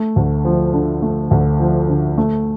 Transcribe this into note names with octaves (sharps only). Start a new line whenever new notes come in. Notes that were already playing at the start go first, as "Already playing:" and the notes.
Already playing: A3
D2
F3
D3
A3
D2
F3
D3
A3